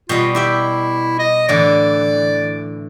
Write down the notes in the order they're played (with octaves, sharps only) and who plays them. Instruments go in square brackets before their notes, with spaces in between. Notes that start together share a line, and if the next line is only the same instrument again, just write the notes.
[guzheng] B2 G3 D#5 [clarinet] F4
[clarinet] E4 [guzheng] G4 E5 G5
[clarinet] D#5
[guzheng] A2 D3 E3 [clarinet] D5